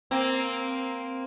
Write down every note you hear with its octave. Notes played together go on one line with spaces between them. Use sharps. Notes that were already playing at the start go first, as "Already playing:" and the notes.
A#3 C4